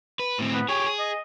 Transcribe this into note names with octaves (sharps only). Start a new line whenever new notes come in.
B4
A2 C4
B3
G4 G#4 C#5
G#4
D#5